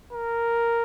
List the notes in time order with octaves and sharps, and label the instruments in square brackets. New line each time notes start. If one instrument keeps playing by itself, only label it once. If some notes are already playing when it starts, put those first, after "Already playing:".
[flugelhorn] A#4